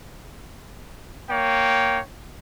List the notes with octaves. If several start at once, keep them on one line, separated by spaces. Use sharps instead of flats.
A#3 C#5 G5